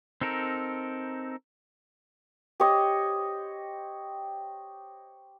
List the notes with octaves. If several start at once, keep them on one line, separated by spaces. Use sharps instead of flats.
C4 D#4 A4 A#4
G4 C5 C#5 D#5